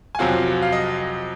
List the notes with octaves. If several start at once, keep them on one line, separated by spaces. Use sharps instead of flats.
G#5
F2 C3 F#3 C4 F4 F#5
F5
D#5